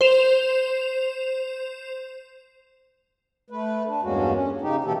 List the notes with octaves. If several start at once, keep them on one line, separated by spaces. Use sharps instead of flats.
C5 E7 F7
A3 B4
D4
E2 G2 G#3 A#3 C#4 F#4
C#4
C#3 D#4 G4
B2 E3 A#3 G4 A4